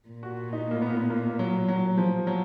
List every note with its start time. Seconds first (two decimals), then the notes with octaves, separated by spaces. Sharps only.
0.08 A#2
0.23 F#4
0.53 D#4
0.71 A#3
0.82 B3
1.10 A#3
1.39 F#3
1.68 F#3
1.97 F3
2.27 F#3